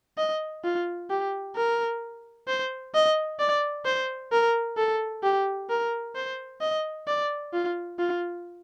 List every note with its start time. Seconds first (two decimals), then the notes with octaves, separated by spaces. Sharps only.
0.18 D#5
0.64 F4
1.10 G4
1.56 A#4
2.48 C5
2.94 D#5
3.39 D5
3.85 C5
4.32 A#4
4.77 A4
5.23 G4
5.70 A#4
6.15 C5
6.61 D#5
7.07 D5
7.53 F4
7.99 F4